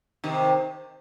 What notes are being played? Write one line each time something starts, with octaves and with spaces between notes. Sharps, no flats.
C3 D#3